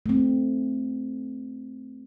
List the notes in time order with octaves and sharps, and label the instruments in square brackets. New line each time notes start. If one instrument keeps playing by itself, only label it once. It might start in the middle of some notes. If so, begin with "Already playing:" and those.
[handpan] A3 C4